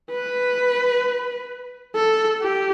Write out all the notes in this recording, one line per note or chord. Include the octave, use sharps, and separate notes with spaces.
B4
A4
G4